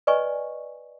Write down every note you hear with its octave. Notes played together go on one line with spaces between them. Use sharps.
B4 D5 D#5 G#5 C#6